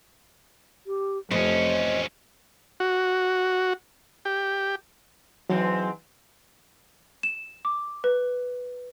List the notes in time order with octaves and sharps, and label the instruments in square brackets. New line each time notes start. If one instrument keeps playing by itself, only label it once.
[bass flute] G4
[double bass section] F1 [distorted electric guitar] E2 C#4 [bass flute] C5 [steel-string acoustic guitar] D#5
[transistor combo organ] F#4
G4
[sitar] G#2 E3 C4 [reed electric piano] F#3
[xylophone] E7
D6
B4